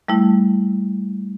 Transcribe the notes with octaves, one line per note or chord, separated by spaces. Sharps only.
G3 A3 E4